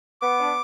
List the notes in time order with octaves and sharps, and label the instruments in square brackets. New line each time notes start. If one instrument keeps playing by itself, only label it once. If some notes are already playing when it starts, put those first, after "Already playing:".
[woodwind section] B3 [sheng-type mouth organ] D6
[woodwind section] D4